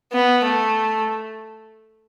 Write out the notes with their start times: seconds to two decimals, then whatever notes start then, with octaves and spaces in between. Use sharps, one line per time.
0.13 B3
0.44 A3